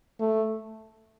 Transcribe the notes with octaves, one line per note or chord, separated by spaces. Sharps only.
A3